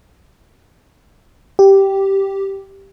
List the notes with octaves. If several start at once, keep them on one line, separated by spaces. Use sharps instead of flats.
G4